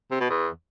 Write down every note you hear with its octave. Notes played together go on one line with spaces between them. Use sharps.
C3
B2
E2